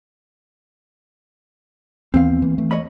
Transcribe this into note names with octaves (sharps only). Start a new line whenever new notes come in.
D#2 E3 B3 C4 F5
E3 A#3
E3 A3
C#5 D#5 B5